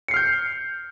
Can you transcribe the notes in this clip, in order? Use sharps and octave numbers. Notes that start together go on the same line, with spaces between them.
F6 G6 C7 C#7